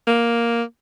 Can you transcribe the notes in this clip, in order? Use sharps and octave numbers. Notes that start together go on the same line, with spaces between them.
A#3